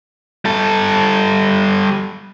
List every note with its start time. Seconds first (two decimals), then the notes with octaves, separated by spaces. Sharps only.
0.45 G3 A4